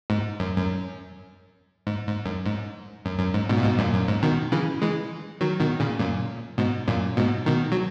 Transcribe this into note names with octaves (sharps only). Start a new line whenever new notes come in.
G#2
F#2
F#2
G#2
G#2
F#2
G#2
F#2
F#2
G#2
G#2 B2
A#2
G#2 B2
F#2 A#2
F#2
G#2
B2 D#3
C#3 E3
E3 G#3
D#3 F#3
B2 D#3
A#2 C#3
F#2 A#2
G#2 B2
F#2 A#2
G#2 B2
B2 D#3
F#3